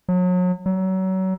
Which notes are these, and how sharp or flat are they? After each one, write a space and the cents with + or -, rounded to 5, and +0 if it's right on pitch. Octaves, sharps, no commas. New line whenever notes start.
F#3 -35
F#3 +30